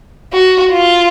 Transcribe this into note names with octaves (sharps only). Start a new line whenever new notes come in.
F#4
F4